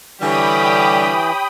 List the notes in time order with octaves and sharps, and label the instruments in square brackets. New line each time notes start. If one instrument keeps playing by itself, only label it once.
[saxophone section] D3 G3 [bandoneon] E3 [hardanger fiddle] G4 C#5 [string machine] G5 B5 D#6